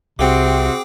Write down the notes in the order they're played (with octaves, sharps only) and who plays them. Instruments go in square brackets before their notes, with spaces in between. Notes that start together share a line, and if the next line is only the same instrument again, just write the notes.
[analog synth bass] C2 [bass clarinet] C3 [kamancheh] C4 F#4 [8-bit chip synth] G#4 G5 D6